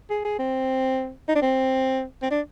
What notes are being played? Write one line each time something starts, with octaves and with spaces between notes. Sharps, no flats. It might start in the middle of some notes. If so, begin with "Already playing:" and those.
G#4
G#4
C4
D#4
D4
C4
C4
D4